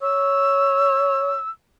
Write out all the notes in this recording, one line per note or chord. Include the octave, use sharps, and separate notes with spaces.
C#5 E6